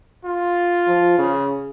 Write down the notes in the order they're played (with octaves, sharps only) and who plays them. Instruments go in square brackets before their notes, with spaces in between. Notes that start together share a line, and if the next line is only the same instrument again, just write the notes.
[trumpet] F4
[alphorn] F3
C#3